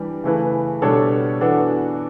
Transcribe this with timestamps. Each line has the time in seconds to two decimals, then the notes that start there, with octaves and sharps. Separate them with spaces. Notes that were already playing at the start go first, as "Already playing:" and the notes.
Already playing: E3 G3 D4 G4
0.24 C#3 E3 A3 E4 B4
0.82 B2 G3 D4 A4 C#5
1.40 E3 B3 D4 F#4 A4